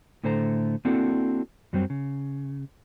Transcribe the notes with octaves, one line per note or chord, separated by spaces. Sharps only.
A2 D3 A3 C5 G#5 A#5
A#3 C4 D4 E4 F#4 A4
F#2 F#3 G3 C4
C#3